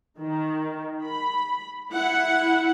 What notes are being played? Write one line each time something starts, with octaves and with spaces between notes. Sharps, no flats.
D#3
B5
E4 F#5